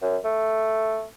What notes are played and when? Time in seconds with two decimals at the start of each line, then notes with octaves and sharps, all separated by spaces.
0.02 F#2
0.25 A3